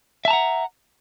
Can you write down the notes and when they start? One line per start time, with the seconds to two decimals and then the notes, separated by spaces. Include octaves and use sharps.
0.25 E5
0.28 A5
0.30 A#5
0.33 F#5